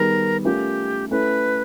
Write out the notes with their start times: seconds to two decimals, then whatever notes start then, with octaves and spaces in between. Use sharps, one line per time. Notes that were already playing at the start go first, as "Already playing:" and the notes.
Already playing: D#3 G3 B3 D#4 G#4 A#4
0.44 A3 C#4 F4 G4 A#4
1.11 A3 C#4 E4 A4 B4